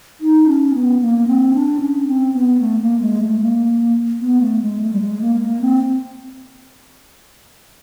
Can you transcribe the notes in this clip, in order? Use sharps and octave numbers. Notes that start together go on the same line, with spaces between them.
D#4
C#4
B3
A#3
C4
D4
C#4
C4
B3
A3
A#3
G#3
A3
A#3
B3
A3
G#3
A3
G3
G#3
A#3
A#3
C4